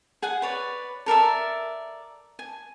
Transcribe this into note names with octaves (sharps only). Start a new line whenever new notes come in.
G#4 F#5 G#5
B4 C#5 D5
A4 A#4 D5 E5
G#5